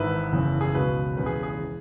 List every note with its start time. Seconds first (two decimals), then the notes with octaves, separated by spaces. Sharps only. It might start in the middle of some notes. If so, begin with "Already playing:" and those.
Already playing: G#1 G#2 E3 B4 E5
0.32 F#1 E2 C#3 E3
0.61 G#4
0.74 C#2 B2 B4
1.17 E1 E2 C#3 B4
1.26 G#4
1.43 G#4
1.59 E3